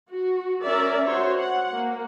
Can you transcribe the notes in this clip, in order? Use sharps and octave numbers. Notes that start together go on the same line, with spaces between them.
F#4
C#4 A#4 D5 E5
F#4 C5 C#5
F#5
A#3